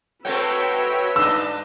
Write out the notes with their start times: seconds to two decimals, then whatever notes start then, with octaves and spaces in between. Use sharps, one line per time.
0.25 G#3 A3 C4 F#4 B4 C#5 E5 G5
1.16 G2 D4 D#5 E6